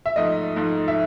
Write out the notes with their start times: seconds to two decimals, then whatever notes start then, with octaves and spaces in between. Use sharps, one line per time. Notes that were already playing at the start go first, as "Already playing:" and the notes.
0.06 E5
0.16 G#2 F3 A3 D#5
0.56 G#2 F3 A3
0.88 E5